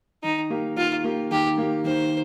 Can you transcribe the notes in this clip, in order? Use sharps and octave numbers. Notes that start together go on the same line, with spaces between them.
D#3 D#4
A#3 G4
D#3 F4
A#3 G4
D#3 G4
A#3 G4
D#3 C5